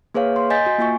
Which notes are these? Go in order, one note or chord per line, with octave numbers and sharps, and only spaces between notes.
A#3 G#4 B4 C#5 F5
C6
D#5 G#5 G6 A6 B6
F#4
A#3 F4 G#5 C#6